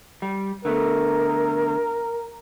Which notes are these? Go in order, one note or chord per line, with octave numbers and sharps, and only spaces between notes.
G3
D3 A3 B3 A#4